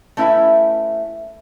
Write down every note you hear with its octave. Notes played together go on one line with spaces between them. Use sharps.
A3 C#4 E4 B4 E5 G#5